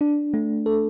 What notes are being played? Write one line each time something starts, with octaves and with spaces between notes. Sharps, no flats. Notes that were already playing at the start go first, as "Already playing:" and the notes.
D4
A3
A4